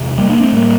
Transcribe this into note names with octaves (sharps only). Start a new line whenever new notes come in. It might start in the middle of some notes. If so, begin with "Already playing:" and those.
Already playing: E1 C3
G3 A#3
A#3 D4
A3 C4
A2 G3 A#3